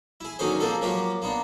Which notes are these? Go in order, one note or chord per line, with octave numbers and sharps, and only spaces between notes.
E4 G#4
D3 D#3 F#3 C#4 G#4 C5
F3 A#3 C4 G#4 A4
F3 F#3 A#3 F4 G4
A#3 B3 D4